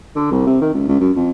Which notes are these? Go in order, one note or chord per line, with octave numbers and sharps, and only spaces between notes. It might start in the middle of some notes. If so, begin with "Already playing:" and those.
D3
C2
C3
D#3
C#2
C#2
F#2
F2